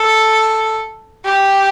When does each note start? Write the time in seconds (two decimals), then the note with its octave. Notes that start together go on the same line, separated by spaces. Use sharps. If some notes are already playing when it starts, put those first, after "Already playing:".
Already playing: A4
1.25 G4